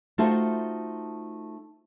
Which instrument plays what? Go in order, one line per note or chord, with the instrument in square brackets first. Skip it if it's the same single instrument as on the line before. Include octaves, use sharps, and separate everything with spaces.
[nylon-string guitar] A3 D#4 F4 F#4 A4 C5